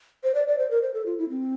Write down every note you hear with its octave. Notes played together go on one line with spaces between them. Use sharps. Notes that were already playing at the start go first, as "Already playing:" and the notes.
C5
D5
D5
C5
A#4
C5
A4
F4
E4
C4